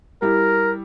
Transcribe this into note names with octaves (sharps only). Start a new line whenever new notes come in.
G3 E4 A#4